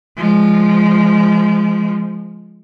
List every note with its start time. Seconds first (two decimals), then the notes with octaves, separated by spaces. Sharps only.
0.17 F3 G#3